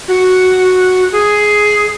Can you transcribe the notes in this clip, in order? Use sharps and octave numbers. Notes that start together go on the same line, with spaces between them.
F#4
G#4